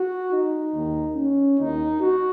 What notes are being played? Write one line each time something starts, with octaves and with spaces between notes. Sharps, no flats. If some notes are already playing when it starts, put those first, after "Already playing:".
Already playing: F#4
D#4
D#2 D#3
C#4
D#2 D#3 D#4
F#4